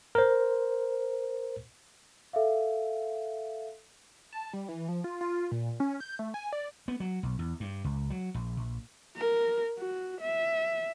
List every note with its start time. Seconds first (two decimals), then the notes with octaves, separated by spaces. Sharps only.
0.15 A#4 C5
2.33 A4 E5 F5
4.33 A5
4.53 G3
4.69 E3
4.89 F3
5.04 F4
5.21 F4
5.51 A#2
5.80 C#4
6.00 G6
6.19 A3
6.34 G#5
6.53 D5
6.88 B3
7.00 F#3
7.23 B1
7.39 E2
7.60 G2
7.84 C#2
8.10 F#3
8.34 A#1
8.57 A#1
9.16 A#4
9.78 F#4
10.21 E5